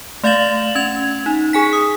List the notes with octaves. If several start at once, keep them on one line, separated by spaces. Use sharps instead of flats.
A3 D5 F5 A6 E7 F#7
C#4 G#6 F7
D#4
G#4 G#5 B6
D#6